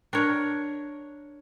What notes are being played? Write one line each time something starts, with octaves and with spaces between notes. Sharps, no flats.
D4 A#4 C#5